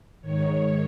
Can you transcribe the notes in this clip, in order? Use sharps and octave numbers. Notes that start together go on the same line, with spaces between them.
G#2 D#3 C#5